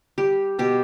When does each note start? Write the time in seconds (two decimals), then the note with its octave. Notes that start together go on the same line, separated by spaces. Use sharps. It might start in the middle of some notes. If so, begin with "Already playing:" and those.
0.18 G3 G4
0.59 B2 G4